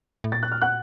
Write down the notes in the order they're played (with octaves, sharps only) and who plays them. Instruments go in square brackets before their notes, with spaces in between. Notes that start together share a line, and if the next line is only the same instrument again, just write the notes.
[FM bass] A2
[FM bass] A#2 [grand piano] A6
[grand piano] F#6
F6
F#5 F#6